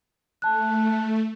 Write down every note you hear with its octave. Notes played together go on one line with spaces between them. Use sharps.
A3 A5 F#6